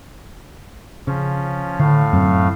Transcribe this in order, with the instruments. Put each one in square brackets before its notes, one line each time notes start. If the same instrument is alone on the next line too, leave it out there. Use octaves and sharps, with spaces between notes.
[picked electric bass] C#3 [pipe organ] F3 C#4
[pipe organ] A2 A3 F5 [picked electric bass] D3
[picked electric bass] F#2 F#3 C4